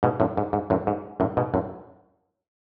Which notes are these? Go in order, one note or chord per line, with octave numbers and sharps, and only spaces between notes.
G#2 B2
F#2 A2
G#2
G#2
F#2 A2
G#2
F#2 A2
G#2 B2
F#2 A2